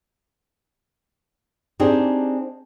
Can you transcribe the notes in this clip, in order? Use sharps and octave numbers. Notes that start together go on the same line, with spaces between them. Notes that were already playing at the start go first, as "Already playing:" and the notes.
C4 D4 D#4 G4 G#4